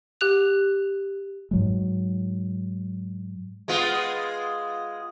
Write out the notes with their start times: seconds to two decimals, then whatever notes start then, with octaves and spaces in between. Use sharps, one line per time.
0.21 G4 F#6 F7
1.51 G#2 F#3 G#3
3.68 G#3 B3 F4